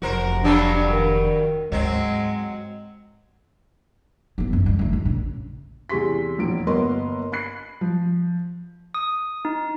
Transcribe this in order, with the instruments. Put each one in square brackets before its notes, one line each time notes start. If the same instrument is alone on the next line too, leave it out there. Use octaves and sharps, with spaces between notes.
[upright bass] F1 [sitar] F#4 A#4 C5
[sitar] G2 F#3 G3 [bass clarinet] D4
[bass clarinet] D#3
[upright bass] D2 G#2 [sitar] F#3 C4 [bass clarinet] G#3
[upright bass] E3 B3
F#2
D#3 G#3
D3 A3
F#2
A#1 C#3
[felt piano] E2 C3 G#4 C6 B6
E1 A#1 D7
G1 A#3 B3 A#4 D#5 C6
B5 F#6 C7
F3
[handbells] D#6
D#4